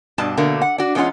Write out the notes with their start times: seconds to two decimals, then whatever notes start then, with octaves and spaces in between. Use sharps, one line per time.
0.18 G2 B2 D4 A5
0.37 B2 D3 A3 A#3
0.62 F#5
0.78 D4 F#4
0.95 E2 G#3 C#4 D4 F4 F#5